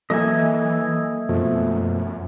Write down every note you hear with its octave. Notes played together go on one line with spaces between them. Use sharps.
E3 F#3 A#3 A4 D#5 E5 G#5
F#2 B2 F3 A3